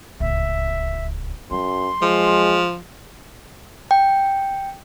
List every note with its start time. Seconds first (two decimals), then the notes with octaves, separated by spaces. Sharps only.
0.20 D1 C#2 E5
1.51 F#2 F#3 C6
2.02 F3 G#3
3.91 G5